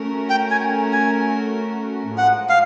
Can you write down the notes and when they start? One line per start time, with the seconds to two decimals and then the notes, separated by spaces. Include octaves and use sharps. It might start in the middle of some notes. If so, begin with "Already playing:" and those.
Already playing: A3 C#4 F#4 A#4
0.30 G5
0.51 G#5
0.93 G#5
2.18 A2 F3 G#3 F#5
2.49 F5